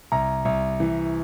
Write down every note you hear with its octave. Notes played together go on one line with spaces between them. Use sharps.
C2 A#5
C2
E3